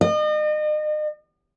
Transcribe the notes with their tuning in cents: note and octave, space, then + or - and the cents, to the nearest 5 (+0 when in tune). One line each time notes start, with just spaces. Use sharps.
D#5 -40